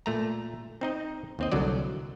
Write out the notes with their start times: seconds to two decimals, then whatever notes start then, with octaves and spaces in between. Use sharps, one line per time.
0.06 A#2 A3 A#5
0.81 C4 D#4 D#5
1.39 D#2 C4 D#5
1.52 C2 D3 F#3 D5